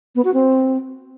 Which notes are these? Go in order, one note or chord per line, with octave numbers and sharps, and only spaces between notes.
B3
F#4
C4